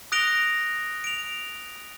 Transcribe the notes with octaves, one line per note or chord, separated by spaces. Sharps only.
D#6 F#6 A#6 D7 F7 G7
D7 F7